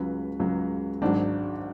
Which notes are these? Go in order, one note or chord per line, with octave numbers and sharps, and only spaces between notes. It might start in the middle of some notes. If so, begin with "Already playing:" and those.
Already playing: C#2 C#3 F#3 B4
C#2 C#3 F#3
G#1 G#2 F#3 D4